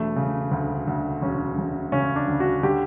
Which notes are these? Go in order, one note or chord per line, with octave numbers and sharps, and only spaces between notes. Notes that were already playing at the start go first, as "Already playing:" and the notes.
Already playing: E1 A3
C#3
D2
D2
E1 C#4
E1
C#3 C#4
D4
D2
F#4
D3 G4